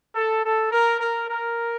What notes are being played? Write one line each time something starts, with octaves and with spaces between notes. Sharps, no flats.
A4
A4
A#4
A#4
A#4